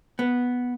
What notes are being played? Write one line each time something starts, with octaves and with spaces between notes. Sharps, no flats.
B3